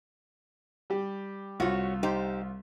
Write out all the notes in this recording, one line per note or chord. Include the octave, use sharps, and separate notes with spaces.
G3 G4
C2 F4 F#4 C#5
D#4 G4 C5